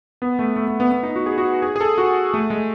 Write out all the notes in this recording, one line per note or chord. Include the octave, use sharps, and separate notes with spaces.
B3
A3
A3
A3
B3
B3
D#4
F#4
G#4
F#4
G#4
G#4
A4
F#4
A3
G#3